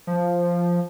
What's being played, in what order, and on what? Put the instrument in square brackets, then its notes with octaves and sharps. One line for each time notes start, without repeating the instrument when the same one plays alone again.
[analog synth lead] F3